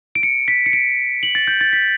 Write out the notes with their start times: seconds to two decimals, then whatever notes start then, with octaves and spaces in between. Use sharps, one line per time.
0.15 D7
0.23 C#7
0.48 B6
0.66 C#7
0.73 D7
1.23 F#7
1.35 A6
1.48 G6
1.61 A6
1.73 B6